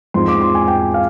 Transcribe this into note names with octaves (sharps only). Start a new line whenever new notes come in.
G#2 F3 C4 D#4 C6
D6
C6
G#5
G5
F5